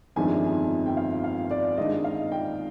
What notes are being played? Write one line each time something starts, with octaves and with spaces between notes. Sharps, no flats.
G1 F2 D#3 G#3 D4 G#5
G5
F5
F5
D5
G#2 D#3 G#3 D4 D#5
F5
G5